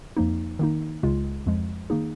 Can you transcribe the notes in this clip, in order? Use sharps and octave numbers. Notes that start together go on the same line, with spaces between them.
F2 F3 A#3 D#4
D#3 A#3 D#4
C#2 C#3 G#3 F4
F2 F3 G#3
D#3 A#3 D#4 G#4